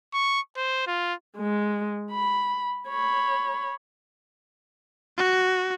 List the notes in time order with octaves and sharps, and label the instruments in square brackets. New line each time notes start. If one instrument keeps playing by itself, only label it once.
[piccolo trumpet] C#6
C5
F4
[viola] G#3
B5
C#5 B5
[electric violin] F#4